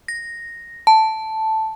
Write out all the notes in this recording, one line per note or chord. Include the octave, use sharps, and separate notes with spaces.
A#6
A5